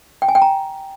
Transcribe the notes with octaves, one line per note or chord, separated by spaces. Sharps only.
G5
G#5
G5
A#5